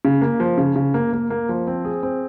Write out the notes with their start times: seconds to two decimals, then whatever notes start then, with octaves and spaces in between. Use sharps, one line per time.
0.05 C#3
0.21 A#3
0.40 F3
0.58 C#3
0.76 C#3
0.94 A#3
1.13 A#3
1.30 A#3
1.49 F3
1.67 C4
1.85 G#4
2.03 C4